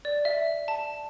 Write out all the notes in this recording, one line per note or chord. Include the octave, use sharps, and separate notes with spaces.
D5
E5
A5